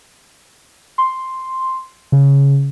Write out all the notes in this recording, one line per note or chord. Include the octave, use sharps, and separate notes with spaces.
C6
C#3